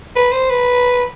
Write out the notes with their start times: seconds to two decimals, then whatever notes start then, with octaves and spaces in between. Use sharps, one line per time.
0.16 B4
0.32 C5
0.50 B4